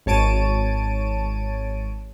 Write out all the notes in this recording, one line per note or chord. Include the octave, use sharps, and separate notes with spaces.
G#1 C#5 A5 D7 D#7